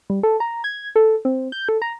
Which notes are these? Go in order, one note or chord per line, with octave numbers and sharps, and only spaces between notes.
G3
A4
A#5
G#6
A4
C4
G6
A4
A#5